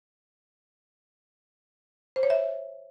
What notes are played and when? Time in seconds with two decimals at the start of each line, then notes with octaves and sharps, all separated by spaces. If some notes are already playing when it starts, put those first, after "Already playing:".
2.16 C5
2.23 C#5
2.30 E5